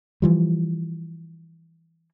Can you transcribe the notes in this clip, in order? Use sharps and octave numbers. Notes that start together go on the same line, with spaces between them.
E3 F3 G3